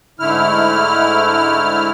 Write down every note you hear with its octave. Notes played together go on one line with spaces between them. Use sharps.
G#2 D3 A3 E4 F6